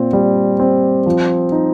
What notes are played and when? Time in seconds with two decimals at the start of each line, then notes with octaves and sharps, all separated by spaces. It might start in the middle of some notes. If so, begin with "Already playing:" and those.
Already playing: A#2 C4
0.13 G3
0.59 C4
1.06 F3
1.52 D#4